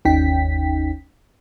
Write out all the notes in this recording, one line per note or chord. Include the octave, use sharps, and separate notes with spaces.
G1 D#2 C#4 D#4 G5 B6